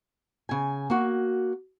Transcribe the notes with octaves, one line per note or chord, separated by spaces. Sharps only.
C#3 G#5
A#3 F#4